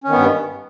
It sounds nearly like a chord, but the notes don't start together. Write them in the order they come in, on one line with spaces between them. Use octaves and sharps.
C#4 D#3 B3 G2